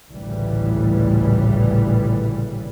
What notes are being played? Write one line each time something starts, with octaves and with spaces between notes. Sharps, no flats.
A1 D2 A#2 C#3 E3 G3